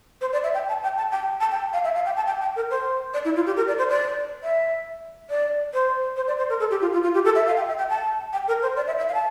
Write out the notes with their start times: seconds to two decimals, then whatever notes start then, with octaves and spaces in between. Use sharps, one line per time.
0.21 C5
0.33 D5
0.44 E5
0.54 G5
0.68 A5
0.83 G5
0.97 A5
1.11 G5
1.41 A5
1.51 G5
1.73 F5
1.84 E5
1.95 F5
2.05 G5
2.16 A5
2.27 G5
2.41 G5
2.56 A#4
2.71 C5
3.14 D5
3.25 E4
3.36 F4
3.46 G4
3.57 A#4
3.67 D5
3.78 C5
3.89 D5
4.43 E5
5.30 D5
5.74 C5
6.16 C5
6.27 D5
6.38 C5
6.49 A#4
6.60 A4
6.70 G4
6.81 F4
6.93 F4
7.03 F4
7.14 G4
7.25 A4
7.35 E5
7.46 F5
7.57 G5
7.68 E5
7.78 G5
7.90 A5
8.33 G5
8.48 A#4
8.62 C5
8.76 D5
8.87 E5
8.98 E5
9.09 F5
9.14 A5